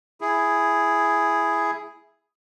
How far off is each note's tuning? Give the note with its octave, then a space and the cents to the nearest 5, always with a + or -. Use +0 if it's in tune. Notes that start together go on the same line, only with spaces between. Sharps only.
E4 +5 G#4 +0